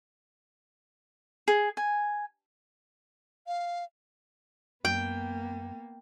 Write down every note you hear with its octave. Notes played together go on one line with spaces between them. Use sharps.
G#4
G#5
F5
F#2 A#3 B3 G5